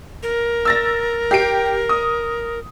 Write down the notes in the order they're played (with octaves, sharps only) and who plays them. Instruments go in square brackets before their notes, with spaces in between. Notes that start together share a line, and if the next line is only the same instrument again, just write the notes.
[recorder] A#4
[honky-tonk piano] E6 A6 A#6
G4 C7 D7
D#6